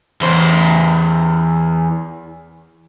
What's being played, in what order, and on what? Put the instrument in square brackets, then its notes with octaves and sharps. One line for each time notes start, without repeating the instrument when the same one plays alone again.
[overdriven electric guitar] E2 C5